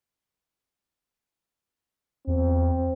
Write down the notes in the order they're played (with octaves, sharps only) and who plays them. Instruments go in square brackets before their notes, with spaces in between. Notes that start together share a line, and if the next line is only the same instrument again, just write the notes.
[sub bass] E2 [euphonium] C4